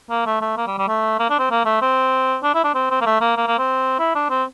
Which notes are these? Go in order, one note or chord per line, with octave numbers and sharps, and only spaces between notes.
A#3
A3
A3
A#3
G3
G3
A3
A#3
D4
C4
A#3
A3
C4
D4
E4
D4
C4
C4
A#3
A3
A#3
A#3
A#3
C4
E4
D4
C4